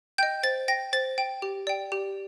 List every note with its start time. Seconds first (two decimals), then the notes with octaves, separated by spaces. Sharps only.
0.18 D#5 G5 G6
0.43 C5 A6
0.68 G5 A#6
0.93 C5 A6
1.18 G5
1.42 G4
1.67 D5 G5
1.92 G4